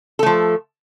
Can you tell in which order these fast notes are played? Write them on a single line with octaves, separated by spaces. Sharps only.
A4 A3 F3